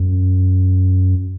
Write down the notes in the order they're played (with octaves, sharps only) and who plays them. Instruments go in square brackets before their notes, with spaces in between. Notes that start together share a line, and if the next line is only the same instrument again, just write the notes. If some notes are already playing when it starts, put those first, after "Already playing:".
Already playing: [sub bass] F#2